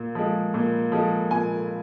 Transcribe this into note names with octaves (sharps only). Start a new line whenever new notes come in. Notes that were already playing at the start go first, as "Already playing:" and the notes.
Already playing: A#2
F3 G#3
A#2
F3 G#3
A#2 G#5